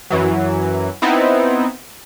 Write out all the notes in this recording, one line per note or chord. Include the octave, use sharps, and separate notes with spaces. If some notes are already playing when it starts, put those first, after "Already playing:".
F#2 E3 F#3
B3 C4 D#4 E4